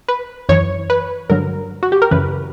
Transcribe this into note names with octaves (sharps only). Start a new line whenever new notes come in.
B4
F#2 E3 C#5
B4
G2 D3 F#3 A#4
F#4
G4
A#4
F#2 C#3 E3 B4